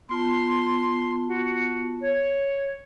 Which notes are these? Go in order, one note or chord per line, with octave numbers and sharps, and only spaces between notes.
B3 F4 A5 C6
F#4
C#5